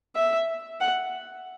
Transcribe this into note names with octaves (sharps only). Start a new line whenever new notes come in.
E5
F#5